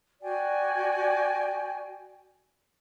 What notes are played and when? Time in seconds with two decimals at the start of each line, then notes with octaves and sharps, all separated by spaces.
0.21 F#4 D5 G5 G#5